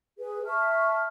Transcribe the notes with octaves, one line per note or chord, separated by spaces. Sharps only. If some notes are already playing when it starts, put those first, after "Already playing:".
G#4 B4
E5 A5 C#6 F6